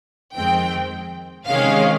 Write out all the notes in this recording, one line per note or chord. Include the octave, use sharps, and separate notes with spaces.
F2 D#3 G#3 C4 G5
C3 D#3 G#3 C#4 F5